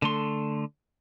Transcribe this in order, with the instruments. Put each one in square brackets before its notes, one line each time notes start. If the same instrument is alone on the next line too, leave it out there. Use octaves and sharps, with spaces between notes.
[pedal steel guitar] D3 A3 C6